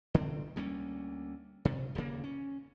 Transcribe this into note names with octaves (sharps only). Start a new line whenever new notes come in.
D3 C4
D2 G3 A#3 C#4
C3
D#1 G2 C#3 A#3
C#4